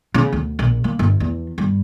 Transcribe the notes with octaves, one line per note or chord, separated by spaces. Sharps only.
C#3
D2
A#1
A#3
G1
E2
G2